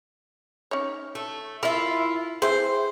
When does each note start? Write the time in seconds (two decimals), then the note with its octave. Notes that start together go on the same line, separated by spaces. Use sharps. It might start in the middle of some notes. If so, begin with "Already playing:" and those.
0.71 C#4 D#4 C#5
1.15 A3
1.63 E4 F4 A#4 E5
2.42 C4 E4 G#4 B4 C5